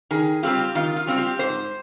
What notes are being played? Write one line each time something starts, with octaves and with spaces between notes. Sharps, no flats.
D#3 G#4
G3 C4 F4 G4
D#3 F4
F4
G3 C4 F4
G4
G#2 C5